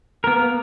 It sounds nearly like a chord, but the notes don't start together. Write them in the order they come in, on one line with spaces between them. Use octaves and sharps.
A#4 B3 A#3